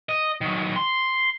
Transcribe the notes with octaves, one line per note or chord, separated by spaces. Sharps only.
D#5
D#3 F#3
C6